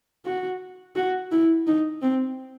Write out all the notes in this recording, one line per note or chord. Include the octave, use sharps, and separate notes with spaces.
F#4
F#4
E4
D#4
C4